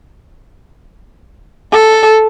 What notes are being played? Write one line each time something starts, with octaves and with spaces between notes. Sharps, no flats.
A4